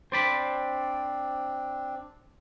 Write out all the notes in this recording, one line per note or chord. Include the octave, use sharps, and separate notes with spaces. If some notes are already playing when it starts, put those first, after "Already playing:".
C4 D4 C5 D5 B5